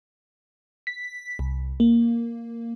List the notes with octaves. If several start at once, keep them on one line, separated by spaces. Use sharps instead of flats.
B6
C2
A#3